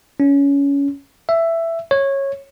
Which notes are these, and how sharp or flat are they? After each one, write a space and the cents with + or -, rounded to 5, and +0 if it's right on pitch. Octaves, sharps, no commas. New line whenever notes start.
C#4 +20
E5 +10
C#5 -15